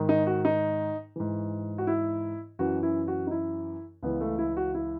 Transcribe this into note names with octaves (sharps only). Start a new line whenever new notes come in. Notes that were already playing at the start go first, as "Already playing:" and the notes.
Already playing: G#2 D#3
D#4
F#4
D#4
G#2 E3
F#4
E4
F#2 E3 F#4
E4
F#4
D#4
E4
C#2 C#3 E3 B3
A3
E4
F#4
E4